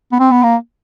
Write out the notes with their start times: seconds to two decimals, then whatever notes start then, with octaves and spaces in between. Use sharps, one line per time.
0.12 B3
0.19 C4
0.31 B3
0.43 A#3